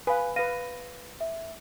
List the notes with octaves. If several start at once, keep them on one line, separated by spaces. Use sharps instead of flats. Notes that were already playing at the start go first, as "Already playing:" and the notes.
B4 F5 G#5
B4 F5 A#6 D#7
E5